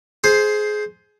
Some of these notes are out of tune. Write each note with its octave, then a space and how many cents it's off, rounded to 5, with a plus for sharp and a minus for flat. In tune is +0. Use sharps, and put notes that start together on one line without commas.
G#4 +20 C5 +0